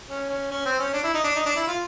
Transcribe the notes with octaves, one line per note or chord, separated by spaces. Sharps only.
C#4
C#4
C#4
C4
C#4
D4
E4
D#4
D4
D#4
D4
E4
F4